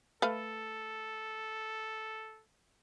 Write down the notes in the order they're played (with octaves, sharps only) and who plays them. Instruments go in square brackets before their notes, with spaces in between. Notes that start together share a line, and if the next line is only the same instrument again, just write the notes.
[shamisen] A3 B4 F5 [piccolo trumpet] A4